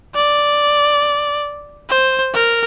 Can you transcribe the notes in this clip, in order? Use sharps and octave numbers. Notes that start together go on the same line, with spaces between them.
D5
C5
A#4